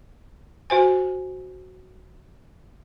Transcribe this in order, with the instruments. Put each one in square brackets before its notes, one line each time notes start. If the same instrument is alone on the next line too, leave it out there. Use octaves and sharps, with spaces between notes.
[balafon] F#4 C5 G#5